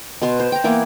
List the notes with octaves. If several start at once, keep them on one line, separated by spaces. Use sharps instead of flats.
B2 B3 C6
C5
G5 A#5
E3 A#3 B3 E4